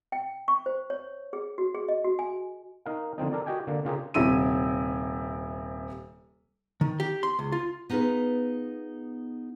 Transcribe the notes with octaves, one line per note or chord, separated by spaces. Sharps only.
G5
C#6
C5
C#5
G#4
F#4
G#4
D#5
F#4
G#5
D#4 A#4 F5
D3 F3 C4 D#4
A4 A#4 D5
F#4 G4 D#5 G5 G#5
D3 A#3
C#3 F4 G4 G#4 A#4
D#1 C3 E4 E6 D#7
D#3
G4
C6
C#2
F4
B3 D#4 F4 G#4 B4